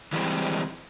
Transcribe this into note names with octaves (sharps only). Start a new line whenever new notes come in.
E3 G3 G#3 C4